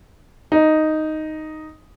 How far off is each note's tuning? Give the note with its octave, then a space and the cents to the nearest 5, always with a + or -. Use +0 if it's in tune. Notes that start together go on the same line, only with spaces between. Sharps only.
D#4 +0